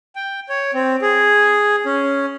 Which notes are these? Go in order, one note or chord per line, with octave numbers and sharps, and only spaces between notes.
G5
C#5
C4
G#4
C#4